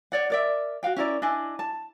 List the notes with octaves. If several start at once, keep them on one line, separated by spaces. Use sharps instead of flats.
C#5 D5 F#5
A#4 D5 E5
F#4 B4 F5 G5
C#4 E4 A#4 D5
D4 E4 D#5 G#5
A5